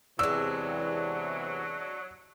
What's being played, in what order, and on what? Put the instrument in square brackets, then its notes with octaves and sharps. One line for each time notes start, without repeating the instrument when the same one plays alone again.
[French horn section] E2 C3 E3 [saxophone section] F#3 [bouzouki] G#3 D4 [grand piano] E6